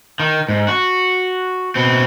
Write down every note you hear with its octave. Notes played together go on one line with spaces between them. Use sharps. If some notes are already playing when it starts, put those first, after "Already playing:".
D#3
G#2
F#4
B2 C4